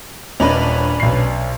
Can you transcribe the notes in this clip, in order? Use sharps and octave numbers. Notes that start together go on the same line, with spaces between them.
D#1 C#4 D4 B4 D#5
B1 C7